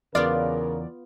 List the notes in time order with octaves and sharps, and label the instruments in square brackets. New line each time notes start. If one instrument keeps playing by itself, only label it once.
[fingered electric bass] E2 [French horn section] C#3 A#4 [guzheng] B3 F4 [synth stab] D5